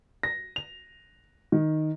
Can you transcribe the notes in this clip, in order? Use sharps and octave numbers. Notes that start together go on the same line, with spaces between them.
A#6
F7
D#3